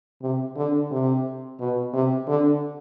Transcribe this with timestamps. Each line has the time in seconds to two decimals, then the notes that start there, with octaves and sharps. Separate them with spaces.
0.22 C3
0.56 D3
0.91 C3
1.59 B2
1.94 C3
2.28 D3